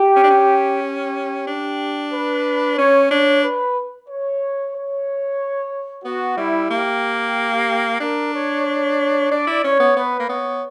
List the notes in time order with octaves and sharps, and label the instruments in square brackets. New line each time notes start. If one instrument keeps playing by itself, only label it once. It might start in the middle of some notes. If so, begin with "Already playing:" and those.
Already playing: [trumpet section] G4
[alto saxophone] C#4
D4
C#4
[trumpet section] G4
[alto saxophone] D4
[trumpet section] B4
[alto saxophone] C#4 [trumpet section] C#5
[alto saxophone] D4 [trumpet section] C#5
[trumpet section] B4
C#5
C#5
[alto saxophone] B3 [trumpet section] F#4
[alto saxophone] G3 [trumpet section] E4
[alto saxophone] A#3 [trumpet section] G4
[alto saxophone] D4 [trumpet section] A#4
[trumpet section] C#5
C#5
[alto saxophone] D4 [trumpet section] D5
[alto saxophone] E4
[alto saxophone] C#4 [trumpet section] C#5
[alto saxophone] B3
[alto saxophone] B3 [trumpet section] B4
[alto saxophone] A#3
[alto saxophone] B3 [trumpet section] C#5